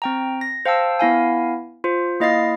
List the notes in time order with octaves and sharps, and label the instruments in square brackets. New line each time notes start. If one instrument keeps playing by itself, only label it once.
[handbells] C4 G5 A#5
A#6
C5 F5 G5 A5 E6
B3 E4 F5 G#5
F4 C5
A#3 E4 D#5 F5 A6 C7